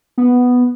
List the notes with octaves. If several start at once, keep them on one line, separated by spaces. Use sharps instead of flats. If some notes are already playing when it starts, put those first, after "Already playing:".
B3